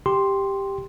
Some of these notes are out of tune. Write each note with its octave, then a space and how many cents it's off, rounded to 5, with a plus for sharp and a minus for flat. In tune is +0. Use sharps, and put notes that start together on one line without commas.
G4 +5 C6 +0